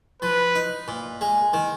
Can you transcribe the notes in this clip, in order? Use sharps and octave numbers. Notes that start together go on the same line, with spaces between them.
F3 B4
D#4
A#2
G#3
D#3